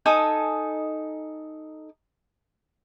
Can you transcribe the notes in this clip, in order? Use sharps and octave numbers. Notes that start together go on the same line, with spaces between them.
D#4 A4 G#5 D#6